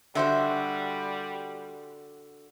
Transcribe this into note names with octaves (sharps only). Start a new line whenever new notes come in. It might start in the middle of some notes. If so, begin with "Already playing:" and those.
D3 G3 F#4 C5 E5